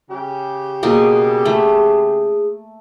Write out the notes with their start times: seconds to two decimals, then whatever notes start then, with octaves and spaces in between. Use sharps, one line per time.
0.10 C#3 G4
0.83 B2 A#3 G#4
1.45 A3